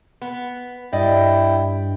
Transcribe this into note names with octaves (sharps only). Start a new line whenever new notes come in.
B3
G2 E4 D5 D#5 G5